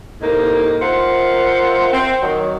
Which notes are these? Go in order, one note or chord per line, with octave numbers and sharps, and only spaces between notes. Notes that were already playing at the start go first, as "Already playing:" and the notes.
A2 C3 A#3 D#4
F4 A#4 C5 E5 F#5
C4
D#3 F#3